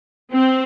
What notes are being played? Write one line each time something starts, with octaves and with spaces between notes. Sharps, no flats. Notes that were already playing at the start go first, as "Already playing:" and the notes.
C4